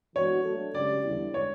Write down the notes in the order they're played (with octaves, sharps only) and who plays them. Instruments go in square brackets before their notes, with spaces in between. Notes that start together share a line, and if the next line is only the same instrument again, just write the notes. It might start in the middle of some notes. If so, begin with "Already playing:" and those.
[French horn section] E3 B3 D4 F#4 [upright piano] C#5
[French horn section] F#3 A3 D4 F#4 A4
[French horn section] C#3 F#3 C#4 G4 [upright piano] D5
[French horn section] E2 D3 G3 B3 E4
[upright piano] C#5